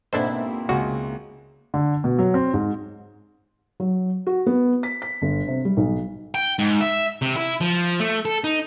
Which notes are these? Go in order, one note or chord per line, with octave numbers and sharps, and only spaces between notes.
G#2 B2 A#3 C4 D4 E4 A4 C5
C#2 F#4
D3
B2
F#3
C4
G#2
F#3
F#4
B3
B6
B6
G1
C3
G3
B1
G5
G#2
E5
C3
E4
F3
A3
A4
D#4